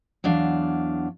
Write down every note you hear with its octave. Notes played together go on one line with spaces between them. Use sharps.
E2 F#3 D4 F5